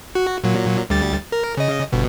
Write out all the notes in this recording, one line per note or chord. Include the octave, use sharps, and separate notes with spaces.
F#4
A#2 F#3
D2 G3 A6
A#4
C#3 D#5
G1 B2